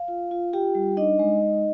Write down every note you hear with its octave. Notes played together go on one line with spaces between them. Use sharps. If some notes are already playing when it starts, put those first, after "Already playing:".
Already playing: F5
F4
F4
F4 G4 G5
G3
D4 D#4 D#5
G#3
G#3